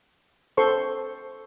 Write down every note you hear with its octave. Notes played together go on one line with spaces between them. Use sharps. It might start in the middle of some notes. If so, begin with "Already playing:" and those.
A4 C5 C6 C#6